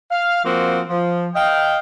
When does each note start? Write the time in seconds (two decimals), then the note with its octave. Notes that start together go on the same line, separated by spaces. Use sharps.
0.11 F5
0.44 F3 A#3 C4 F#4
0.89 F3
1.35 D#5 F5 G5